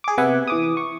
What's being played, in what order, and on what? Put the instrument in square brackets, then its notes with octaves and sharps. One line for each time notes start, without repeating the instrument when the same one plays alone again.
[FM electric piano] G#4 D6
C3 B3 E5 F#5 G#5
E3 D6 D#6
C#6